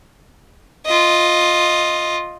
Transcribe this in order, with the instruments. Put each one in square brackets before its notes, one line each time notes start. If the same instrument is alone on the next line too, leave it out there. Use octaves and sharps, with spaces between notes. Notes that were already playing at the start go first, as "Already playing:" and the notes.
[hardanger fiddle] F4 D#5